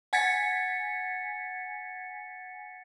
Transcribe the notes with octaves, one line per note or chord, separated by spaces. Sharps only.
F#5 G#5 G#6 A6 B6 C#7